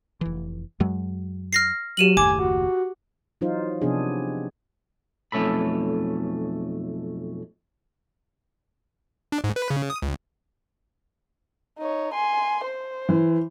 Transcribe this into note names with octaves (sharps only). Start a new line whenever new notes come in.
F1 E3
F#2 F#3 G#3
F6 A#6 C7
F#3 G4 D#7 F#7
F#1 D#2 A2 G#5 D6
F#4
E3 F#3 D#4 F4 C5
C3 F3 B3 D4 G#4
B1 F2 A3 C#4 A4 B5
D4
G#2
B4
C#3
D#6
C#2
D#4 C#5
G#5 C6
C5
E3